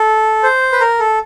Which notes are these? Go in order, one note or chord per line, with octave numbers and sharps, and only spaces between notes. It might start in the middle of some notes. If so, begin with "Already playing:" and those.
Already playing: A4
C5
B4
A#4
A4